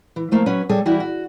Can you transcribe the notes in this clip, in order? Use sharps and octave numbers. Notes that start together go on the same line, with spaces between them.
E3
F3 A3 A#3
F#3 C#4 B4 C#5
G3 G#4 A4 C#5
E3 G3 E4 F#4
F#4